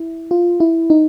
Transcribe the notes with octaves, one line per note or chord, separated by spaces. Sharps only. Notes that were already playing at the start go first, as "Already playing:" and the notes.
Already playing: E4
F4
E4
D#4